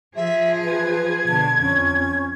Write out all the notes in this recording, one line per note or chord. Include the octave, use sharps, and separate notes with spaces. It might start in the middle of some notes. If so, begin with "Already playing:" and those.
F3 G#4 E5
B4 G#6
B2 D3 A5
F2 C#4